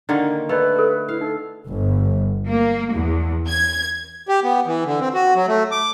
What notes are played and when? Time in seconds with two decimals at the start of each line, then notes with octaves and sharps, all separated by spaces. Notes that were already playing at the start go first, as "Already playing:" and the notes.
0.09 D3 D#3 A#3
0.49 A3 B4 D5 D#5 B5
0.76 A4 A#4
1.09 E4 F5
1.21 D#4 A4
1.69 G1
2.47 A#3
2.94 E2
3.49 G#6
4.28 G4
4.44 B3
4.66 E3
4.85 D3
5.00 C4
5.14 F#4
5.35 F#3
5.48 A3
5.71 D6